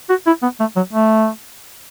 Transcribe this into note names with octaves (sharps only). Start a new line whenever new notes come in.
F#4
E4
B3
A3
F#3
A3